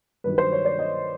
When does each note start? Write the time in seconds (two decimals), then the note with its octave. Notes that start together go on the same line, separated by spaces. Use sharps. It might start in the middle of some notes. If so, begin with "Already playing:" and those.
0.24 G2 D#3 F#3 B4
0.38 C5
0.52 C#5
0.65 D5
0.79 D#5